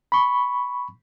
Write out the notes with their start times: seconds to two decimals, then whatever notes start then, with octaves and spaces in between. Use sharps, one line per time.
0.12 B5 C#6